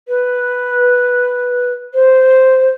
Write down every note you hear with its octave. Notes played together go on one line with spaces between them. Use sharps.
B4
C5